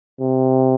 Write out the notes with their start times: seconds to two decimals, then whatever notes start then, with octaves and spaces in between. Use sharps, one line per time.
0.20 C3